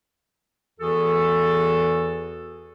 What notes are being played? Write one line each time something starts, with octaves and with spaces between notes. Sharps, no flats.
E2 E3 F#4 G#4 A4